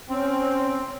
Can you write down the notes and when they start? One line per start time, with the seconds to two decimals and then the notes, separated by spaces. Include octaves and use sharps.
0.09 C4 C#4